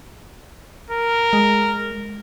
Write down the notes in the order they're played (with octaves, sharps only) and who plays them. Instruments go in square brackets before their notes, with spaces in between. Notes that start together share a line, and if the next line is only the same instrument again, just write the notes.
[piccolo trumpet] A#4
[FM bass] G#3